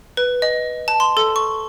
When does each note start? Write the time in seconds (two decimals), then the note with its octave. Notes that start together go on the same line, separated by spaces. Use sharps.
0.17 B4
0.42 D#5
0.88 A5
1.00 C6
1.17 A4
1.36 C#6